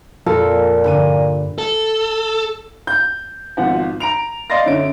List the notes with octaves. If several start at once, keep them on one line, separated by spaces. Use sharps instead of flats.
F2 A#2 A4 A#4
G2 D3 D#7
A4
G6
G#1 B2 F3 F#5
A#5 D7 F7
D5 D#5 F5 C6 A6 A#6
F#2 D3 C#4 E5 D7